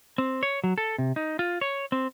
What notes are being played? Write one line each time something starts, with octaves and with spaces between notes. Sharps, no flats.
C4
C#5
F#3
A4
C3
D#4
F4
C#5
C4